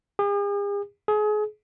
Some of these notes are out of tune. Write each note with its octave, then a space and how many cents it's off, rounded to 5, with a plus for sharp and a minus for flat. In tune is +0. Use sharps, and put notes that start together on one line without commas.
G#4 -45
G#4 +30